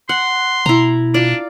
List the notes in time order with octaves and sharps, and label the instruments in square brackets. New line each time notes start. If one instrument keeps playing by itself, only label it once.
[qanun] F#5 [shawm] C6
[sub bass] B2 [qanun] E4 A#5
[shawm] D4 [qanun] F4 D5